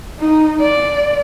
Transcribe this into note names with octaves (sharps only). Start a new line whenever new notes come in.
D#4
D5